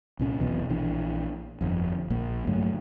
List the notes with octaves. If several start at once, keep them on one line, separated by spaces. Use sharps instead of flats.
C2 A#2 C#4
F1 B1 B2 E3
A#1 E3 D4
G1 F2
A#1 A#2
G2 D3 F#3 A3